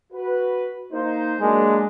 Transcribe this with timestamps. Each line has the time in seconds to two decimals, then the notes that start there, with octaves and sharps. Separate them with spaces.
0.13 F#4 B4
0.92 A#3 D#4 C5
1.41 F#3 G#3 A#3 D4